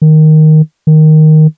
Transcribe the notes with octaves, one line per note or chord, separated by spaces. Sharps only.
D#3
D#3